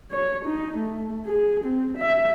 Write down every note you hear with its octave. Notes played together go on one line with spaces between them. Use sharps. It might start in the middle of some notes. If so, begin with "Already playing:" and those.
C#5
D#4
A3
G#4
C4
E5